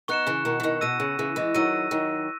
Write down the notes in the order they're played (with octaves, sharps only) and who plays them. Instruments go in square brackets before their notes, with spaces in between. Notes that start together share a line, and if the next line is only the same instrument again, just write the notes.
[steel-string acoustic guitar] B3 D#4 [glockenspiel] C#6 F#6 C#7 E7
[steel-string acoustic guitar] C#3 E3
B2 D#3
E3
B2 D#3
[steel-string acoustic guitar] B2 [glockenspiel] E6 A#6 D#7
[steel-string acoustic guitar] C#3
C#3 E3
E3 G#3
[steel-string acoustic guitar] D#3 F#3 [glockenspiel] E6 A#6 D#7
[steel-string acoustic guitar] D#3 F#3